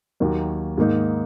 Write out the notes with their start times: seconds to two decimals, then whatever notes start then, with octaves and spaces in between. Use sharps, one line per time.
0.20 D#2 D#3 F#3 A#3
0.78 G#2 D#3 A#3 D#4